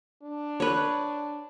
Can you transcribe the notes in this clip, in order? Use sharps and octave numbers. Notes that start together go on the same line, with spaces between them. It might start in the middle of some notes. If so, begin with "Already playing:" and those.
D4
B4 C#5